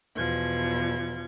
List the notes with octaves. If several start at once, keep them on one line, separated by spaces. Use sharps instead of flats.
E2 B2 F3 G#6